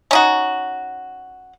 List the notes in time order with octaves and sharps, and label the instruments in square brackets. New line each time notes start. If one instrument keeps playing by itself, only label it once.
[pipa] C#4 D#4 F#4